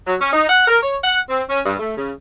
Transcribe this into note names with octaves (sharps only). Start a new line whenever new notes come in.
F#3
C#4
D#4
F#5
A#4
C#5
F#5
C4
C#4
G2
A3
C#3